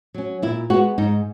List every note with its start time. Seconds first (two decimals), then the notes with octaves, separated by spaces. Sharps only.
0.14 F#3 C#4
0.42 A#2 E4
0.70 G#3 B3 F#4
0.98 G#2 D#4